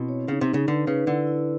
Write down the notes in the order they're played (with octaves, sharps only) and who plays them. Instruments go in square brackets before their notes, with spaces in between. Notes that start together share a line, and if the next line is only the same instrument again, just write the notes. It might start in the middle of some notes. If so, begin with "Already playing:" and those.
Already playing: [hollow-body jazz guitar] B2 [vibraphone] C4 E4
[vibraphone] C#5
[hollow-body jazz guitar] C#3 [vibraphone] D#4
[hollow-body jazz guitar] C3
[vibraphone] D#4
[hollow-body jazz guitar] C#3
[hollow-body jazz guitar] D3 [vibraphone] B4
[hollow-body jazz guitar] C#3 [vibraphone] B4
[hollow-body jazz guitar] D3 [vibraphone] E4
[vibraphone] E4